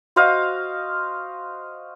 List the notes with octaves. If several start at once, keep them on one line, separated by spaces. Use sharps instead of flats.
F#4 C5 D#5 F5